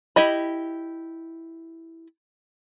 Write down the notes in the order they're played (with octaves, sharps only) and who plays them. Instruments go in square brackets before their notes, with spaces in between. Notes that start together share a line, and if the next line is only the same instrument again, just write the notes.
[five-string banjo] E4 G4 D#5 B5